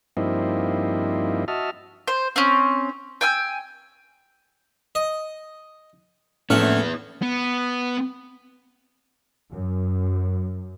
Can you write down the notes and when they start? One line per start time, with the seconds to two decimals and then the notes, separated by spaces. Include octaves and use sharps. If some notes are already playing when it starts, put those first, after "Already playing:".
0.17 G2 F3 A#3 C4 D#4 E4
1.48 F#4 D#5 E5 A5 F6
2.08 C5
2.36 C4 C#4
3.21 G5 G#5 E6
4.95 D#5
6.50 A#1 A2 A3 B3 C#4 E4 F#5 F6
7.22 B3
9.52 F#2